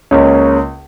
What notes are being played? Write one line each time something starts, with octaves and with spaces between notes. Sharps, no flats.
C#2 C#3 A#3 C#4